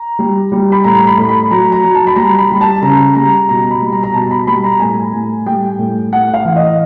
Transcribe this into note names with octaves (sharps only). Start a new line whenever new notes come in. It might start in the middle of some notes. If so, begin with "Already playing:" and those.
Already playing: A#5
G3
G3
B5
A2 A#5
B5
A2
B5
F#3 A#5
A#5
F#3
A5
B5
G3 A#5
B5
G3
A5
C#3 A#5
G3 A#5
B2 A#5
B5
G3
A#5
A#5
B2 A5
B5
G3 B5
A#5
A2 G#5
A2
G3 G5
A2
A2 F#5
F5
E3
D#5